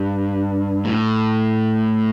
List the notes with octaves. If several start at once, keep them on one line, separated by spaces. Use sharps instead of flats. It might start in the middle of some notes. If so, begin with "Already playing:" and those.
Already playing: G2
A2